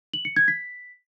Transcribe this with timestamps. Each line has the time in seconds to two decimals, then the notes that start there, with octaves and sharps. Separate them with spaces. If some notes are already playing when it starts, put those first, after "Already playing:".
0.14 F#7
0.25 C#7
0.36 G#6
0.48 B6